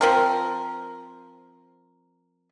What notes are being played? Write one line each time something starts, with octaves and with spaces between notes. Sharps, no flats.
F3 C4 A#4